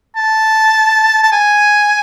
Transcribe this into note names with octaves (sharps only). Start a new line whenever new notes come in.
A5
A5
G#5